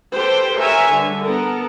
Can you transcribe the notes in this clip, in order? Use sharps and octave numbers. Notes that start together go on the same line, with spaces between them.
G4 A4 B4 C5 G5
A#4 B4 C#5 E5 G#5
D3 G3
B3 A4 A#4